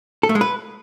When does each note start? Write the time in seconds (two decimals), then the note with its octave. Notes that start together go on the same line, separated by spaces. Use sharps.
0.23 A4
0.29 A3
0.35 G#3
0.41 B4